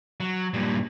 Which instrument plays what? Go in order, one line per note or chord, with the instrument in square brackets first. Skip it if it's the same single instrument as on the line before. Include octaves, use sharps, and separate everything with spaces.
[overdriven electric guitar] F#3
G2 A#2